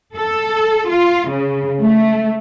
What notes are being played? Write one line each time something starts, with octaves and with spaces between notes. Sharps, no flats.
A4
F4
C#3
A3